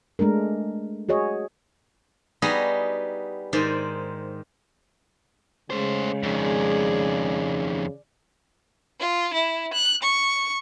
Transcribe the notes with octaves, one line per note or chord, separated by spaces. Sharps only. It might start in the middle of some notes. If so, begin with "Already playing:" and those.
G#3 A3 D4 A#4
F#4 G#4 C#5 D#5
G3 B3 D#4 F#4 G#4 D#5
G#2 D#3 C5 D5
C#3 G#3 A3 C5
F2 D#3 G#4 D5
F4
E4
F#6
C#6